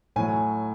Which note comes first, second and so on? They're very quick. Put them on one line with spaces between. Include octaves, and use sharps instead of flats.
A2 G#5 F#3